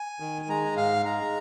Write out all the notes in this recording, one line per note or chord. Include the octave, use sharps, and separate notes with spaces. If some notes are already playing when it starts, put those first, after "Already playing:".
Already playing: G#5
D#3
G#5
G#3 A#5
G#2 F5
G#3 A#5